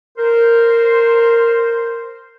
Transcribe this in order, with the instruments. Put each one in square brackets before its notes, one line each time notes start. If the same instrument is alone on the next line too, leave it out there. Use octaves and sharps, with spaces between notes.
[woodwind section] A#4 C5